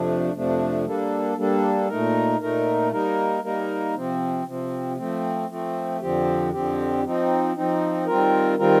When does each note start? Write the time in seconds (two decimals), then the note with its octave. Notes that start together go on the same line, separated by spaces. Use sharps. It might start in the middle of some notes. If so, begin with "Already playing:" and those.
Already playing: F2 C3 F3 A3 D4
0.33 F2 C3 F3 A3 D4
0.85 G3 A#3 D4 A4
1.37 G3 A#3 D4 A4
1.88 A#2 A3 D#4 A#4
2.40 A#2 A3 D#4 A#4
2.91 G3 A#3 D#4 A#4
3.42 G3 A#3 D#4 A#4
3.95 C3 F3 C4
4.46 C3 F3 C4
4.97 F3 A3 C4
5.49 F3 A3 C4
6.01 F2 D3 F3 C4 G4
6.52 F2 D3 F3 C4 G4
7.03 F3 C4 D#4
7.55 F3 C4 D#4
8.06 D#3 G3 C4 F4 A#4
8.58 D#3 G3 C4 F4 A#4